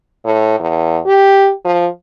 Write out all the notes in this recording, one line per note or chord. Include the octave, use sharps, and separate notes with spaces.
A2
E2
G4
F3